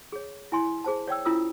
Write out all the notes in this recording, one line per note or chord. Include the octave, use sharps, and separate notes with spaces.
G#4 C#5
E4 G#5 C6
G#4 C5 A5
C#5 D5 G5 E6
C#4 E4 F4 A#4 D#6 E6